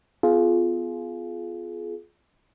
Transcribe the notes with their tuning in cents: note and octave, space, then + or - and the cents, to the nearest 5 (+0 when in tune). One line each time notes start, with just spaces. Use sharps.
B3 +25 F4 +0 G#4 +30